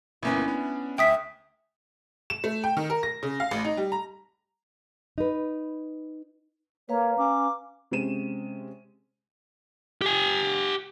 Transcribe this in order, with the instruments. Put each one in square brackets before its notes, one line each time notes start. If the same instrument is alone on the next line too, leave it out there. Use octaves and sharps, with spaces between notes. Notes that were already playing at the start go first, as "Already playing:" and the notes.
[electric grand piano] G1 A#3 B3 [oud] C#4 E4
[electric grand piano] B3 D4
[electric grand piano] D2 [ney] E5 [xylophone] G5 D#6 B6
[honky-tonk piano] E7
A3
G5
D#3
A#4
A#6
C#3
F5
A1
D#4
G3
A#5
[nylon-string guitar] D#4 B4
[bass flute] A#3 [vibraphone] B4 F5 A#5 [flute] C#5
[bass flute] C#4 [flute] D6
[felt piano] C3 G#3 C4 C#4 D#7 E7
[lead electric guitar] G4 G#5